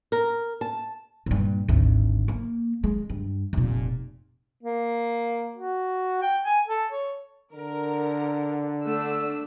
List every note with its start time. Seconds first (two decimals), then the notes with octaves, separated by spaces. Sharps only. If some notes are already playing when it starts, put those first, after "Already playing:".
0.12 A#4
0.61 A5
1.26 G2 A#2
1.69 G#1 D2
2.28 A#3
2.84 G#3
3.10 G2
3.53 F1 A#2
4.63 A#3
5.55 F#4
6.22 G5
6.45 G#5
6.68 A4
6.92 C#5
7.53 D3 A#4
8.86 A3 D4 E6